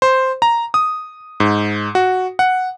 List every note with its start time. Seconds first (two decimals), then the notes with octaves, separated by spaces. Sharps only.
0.02 C5
0.42 A#5
0.74 D#6
1.40 G#2
1.95 F#4
2.39 F#5